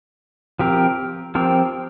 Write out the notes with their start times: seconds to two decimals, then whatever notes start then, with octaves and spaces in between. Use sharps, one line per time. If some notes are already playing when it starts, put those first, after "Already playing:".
0.59 F3 C4 G4 A#4
1.35 F3 C4 G4 A#4